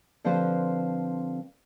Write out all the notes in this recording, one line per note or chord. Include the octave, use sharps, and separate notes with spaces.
D3 F3 C4 G4 B4 C5